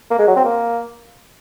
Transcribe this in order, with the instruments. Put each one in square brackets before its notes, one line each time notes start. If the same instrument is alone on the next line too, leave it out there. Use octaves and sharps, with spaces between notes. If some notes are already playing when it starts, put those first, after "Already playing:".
[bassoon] A#3
G#3
F#3
C4
A#3